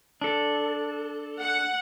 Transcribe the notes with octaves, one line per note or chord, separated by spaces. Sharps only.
D4 A4
F#5